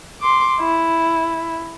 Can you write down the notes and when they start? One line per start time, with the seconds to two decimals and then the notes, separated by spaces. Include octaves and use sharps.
0.21 C6 D6
0.60 E4